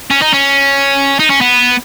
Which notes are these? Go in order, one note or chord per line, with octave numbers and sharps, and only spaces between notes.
C#4
D#4
C#4
D#4
C#4
B3